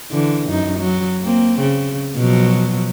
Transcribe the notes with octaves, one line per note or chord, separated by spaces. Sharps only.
D3 E3
F#2 D#4
F#3
A#3 C4
C#3
B2 F3 F#3